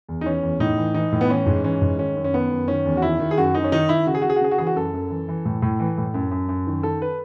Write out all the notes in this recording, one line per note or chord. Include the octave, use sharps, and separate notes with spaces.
E2
D#4
E3 C#4
E2
A2 D#4
E3
E3 D#4
A2
B3
E3 C#4
G#2
E3 C#4
G#2
D#3 C#4
F#2
C#4
D#3 B3
F#2
D#3 C#4
E2
F#4
D#3 E4
D#3
G#4
F#2 F#4
F#2 D#4
C#4
D#3 D#4
D#3 E4
C#3 F#4
G#4
C#3 F#4
G#4
F#4
C#3 G#4
F#4
E3 G#4
F#4
F#2 A4
F#2
E3
E3
A2
A2
E3
A2
F#2
F#2
F#2
D#3
D#3 A4
B4